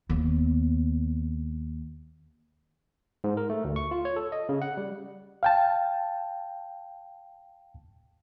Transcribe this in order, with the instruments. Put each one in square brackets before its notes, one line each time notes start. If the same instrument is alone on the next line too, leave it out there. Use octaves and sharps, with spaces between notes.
[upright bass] D#2 B3
[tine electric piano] G#2
A#4
A3
D2
C#6
F4
C#5
A4
D#5
C#3
F#5
G3
[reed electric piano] F5 G5 A5